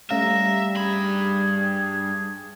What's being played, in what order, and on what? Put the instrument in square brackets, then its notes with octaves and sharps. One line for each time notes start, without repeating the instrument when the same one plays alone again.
[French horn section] G3 [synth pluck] A3 C#4 F5 [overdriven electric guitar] E5 [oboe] A#5
[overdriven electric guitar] G2 B5 [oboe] G#4